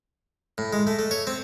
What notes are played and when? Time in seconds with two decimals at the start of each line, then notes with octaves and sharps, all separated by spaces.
0.58 A2
0.73 G#3
0.87 A3
0.99 A3
1.11 C#5
1.27 C4